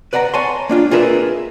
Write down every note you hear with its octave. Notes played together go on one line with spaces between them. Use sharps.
B4 D5 F#5 A5 A#5
C#5 G#5 A5 C6
A#3 D4 F4
F4 G#4 A#4 B4 E5